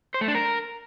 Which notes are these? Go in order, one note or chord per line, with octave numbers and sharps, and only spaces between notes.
C5
A3
D4
A#4